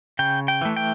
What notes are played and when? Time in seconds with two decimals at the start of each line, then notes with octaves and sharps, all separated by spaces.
0.19 C#3 G5
0.48 G5
0.61 E3 A3
0.77 G5